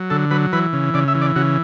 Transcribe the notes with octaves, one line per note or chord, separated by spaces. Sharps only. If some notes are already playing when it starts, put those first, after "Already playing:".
Already playing: F#3
D3 A4
F#3 B4
E3 B4
C#3
C#3 D5
E5
E3
D5
C#3 F#4